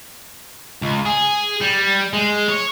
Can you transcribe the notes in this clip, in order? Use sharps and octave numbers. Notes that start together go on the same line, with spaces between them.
C#2
G#4
G3
G#3
C#5